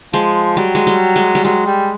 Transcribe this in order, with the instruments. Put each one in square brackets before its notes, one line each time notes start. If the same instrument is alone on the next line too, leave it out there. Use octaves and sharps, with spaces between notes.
[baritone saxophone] F3 [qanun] G#3
[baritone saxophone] F#3 [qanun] G3
[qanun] G#3
G3
G#3
G3
[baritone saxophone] F#3 [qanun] G#3
[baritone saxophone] G3